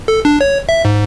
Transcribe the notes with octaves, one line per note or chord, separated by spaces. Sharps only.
A4
D4
C#5
E5
G#2